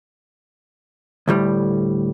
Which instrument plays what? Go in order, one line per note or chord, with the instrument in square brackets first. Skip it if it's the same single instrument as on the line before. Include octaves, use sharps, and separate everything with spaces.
[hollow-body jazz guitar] D2 A2 G3